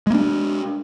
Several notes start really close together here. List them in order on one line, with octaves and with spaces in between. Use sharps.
G#3 A#3 D4